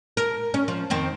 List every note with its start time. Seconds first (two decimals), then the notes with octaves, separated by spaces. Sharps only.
0.17 A#4
0.54 C#4
0.68 F3
0.90 F2 D#3 C4